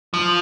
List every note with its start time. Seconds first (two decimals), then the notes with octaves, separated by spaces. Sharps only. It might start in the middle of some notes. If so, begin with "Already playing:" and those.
0.14 F3